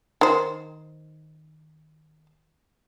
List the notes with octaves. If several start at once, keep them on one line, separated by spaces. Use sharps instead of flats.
D#3 C5